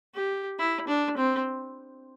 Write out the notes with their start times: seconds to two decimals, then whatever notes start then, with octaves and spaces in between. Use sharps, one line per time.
0.14 G4
0.58 E4
0.88 D4
1.17 C4